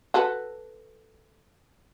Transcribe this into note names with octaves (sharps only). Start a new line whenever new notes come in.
F#4 A4 B4